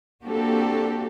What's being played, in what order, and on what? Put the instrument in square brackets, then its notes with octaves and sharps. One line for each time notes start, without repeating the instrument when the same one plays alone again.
[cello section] A#3 C4 D4 F#4 G4 A4